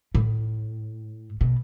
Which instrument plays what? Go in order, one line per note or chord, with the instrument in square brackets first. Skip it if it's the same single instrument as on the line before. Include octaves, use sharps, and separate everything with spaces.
[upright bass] A2
B2